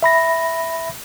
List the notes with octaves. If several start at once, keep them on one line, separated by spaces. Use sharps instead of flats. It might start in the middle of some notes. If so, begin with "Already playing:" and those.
E5 B5 A#6